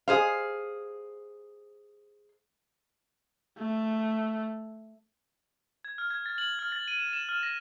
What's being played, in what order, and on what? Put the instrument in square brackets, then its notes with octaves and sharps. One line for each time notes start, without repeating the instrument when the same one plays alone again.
[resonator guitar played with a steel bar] G#4 C5 F5
[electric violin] A3
[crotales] G#6
F6
G#6
A6
F#7
F6
A6
D#7
E7
E7
F6
A#6